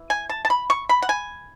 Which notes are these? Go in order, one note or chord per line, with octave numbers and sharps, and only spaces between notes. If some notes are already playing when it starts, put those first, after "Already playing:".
Already playing: E3
G#5
A5
A5
B5
C#6
B5
F#5
G#5